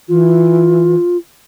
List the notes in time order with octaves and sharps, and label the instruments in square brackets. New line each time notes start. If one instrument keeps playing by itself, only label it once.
[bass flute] E3 [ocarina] F4